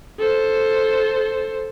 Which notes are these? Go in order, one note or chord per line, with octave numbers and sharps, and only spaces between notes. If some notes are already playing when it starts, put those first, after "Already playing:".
A4 C5